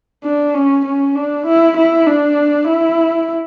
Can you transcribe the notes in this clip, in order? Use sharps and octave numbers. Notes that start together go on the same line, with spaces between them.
D4
C#4
C#4
D4
E4
E4
D4
E4